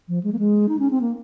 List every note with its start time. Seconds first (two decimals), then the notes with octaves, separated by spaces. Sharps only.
0.08 F3
0.23 G#3
0.33 A#3
0.39 G#3
0.69 D#4
0.79 C#4
0.91 C4
1.01 A#3